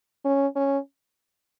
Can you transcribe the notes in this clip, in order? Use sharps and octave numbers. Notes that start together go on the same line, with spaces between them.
C#4
C#4